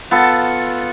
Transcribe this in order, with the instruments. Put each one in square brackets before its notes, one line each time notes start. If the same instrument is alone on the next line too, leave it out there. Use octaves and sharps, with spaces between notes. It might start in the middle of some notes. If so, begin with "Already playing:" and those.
[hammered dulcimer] B3 F4 A4